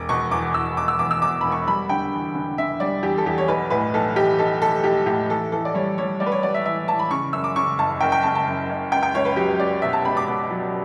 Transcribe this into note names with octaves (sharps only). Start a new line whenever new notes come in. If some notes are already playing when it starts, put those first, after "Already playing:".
Already playing: E1 D6
B2 C#6
E2 D6
E2 E6
B2 D6
E6
E2 D6
E6
B2 D6
E1 B5
C#6
G3 B5
D3 G5
E2
D3
D3 E5
G3 D5
E2 G4
A4
E2 G4
C#5
B1 B4
A2 B4
B1 A4
B1 G4
B1 A4
B1 A4
B1 G4
A2 G4
E3 A4
E3 A4
D5
G3 C#5
G3 C#5
G3 D5
B4
C#5
G3 D5
E5
E3 E5
E3 A5
B5
C#3 C#6
F#2 E6
D6
C#3 C#6
F#1 A5
F#1 G5
G5
C#3 A5
A5
F#2
F#1
C#2 G5
G5
C#2 C#5
B4
F#3 G4
C#2 D5
B2 E5
A5
C#2 B5
D6
B2
F#3